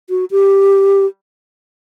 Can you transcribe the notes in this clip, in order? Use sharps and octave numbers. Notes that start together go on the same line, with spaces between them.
F#4
G4